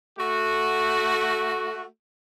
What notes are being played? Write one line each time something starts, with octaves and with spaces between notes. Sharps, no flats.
A3 F#4